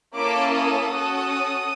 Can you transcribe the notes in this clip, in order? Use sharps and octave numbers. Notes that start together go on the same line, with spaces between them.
A#3 C#4 E4 A4 D6
D#6
C#4 F#4 A4